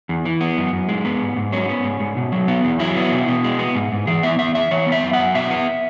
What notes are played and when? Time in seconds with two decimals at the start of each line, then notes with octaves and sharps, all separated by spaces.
0.09 E2
0.25 E3
0.41 B3
0.57 F#2
0.73 F#2
0.89 G#3
1.05 B3
1.21 G#2
1.37 G#2
1.52 F#3 C#4
1.69 B3
1.84 G#2
2.00 G#2
2.17 B2
2.32 F#3
2.48 B3
2.64 E2
2.79 F#3 E4
2.96 B3
3.12 B2
3.28 B2
3.44 G#3
3.59 B3
3.75 G#2
3.92 G#2
4.07 E3 G#4
4.23 B3 E5
4.39 E2 E5
4.55 E2 E5
4.71 E3 C#5
4.87 B3
4.92 E5
5.03 F#2
5.13 F#5
5.19 F#2
5.34 B2 E5
5.50 B3